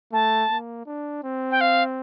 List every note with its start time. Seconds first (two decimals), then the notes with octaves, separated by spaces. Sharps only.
0.12 A3 A5
0.50 A#3
0.86 D4
1.24 C4
1.51 G5
1.61 F5